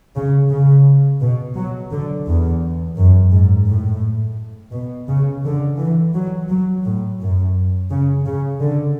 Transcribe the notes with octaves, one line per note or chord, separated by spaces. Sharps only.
C#3
C#3
B2
F#3
D3
E2
F#2
G#2
A2
B2
C#3
D3
E3
F#3
F#3
A2
F#2
C#3
C#3
D3